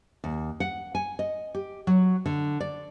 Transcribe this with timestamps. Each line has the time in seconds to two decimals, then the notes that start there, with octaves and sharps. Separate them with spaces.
0.24 D#2
0.60 F#5
0.95 G#5
1.19 D#5
1.54 G4
1.87 F#3
2.26 D3
2.60 D5